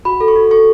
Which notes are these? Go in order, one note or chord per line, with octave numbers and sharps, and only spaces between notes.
F#4 B5
A4
C#6
F#4
A4 C#6